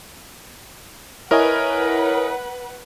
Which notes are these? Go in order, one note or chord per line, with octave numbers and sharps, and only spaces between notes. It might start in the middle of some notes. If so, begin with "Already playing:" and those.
E4 A#4 B4 C#5 D#5 F#5 G#5